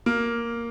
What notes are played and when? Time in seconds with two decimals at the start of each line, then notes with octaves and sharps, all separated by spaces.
0.06 A#3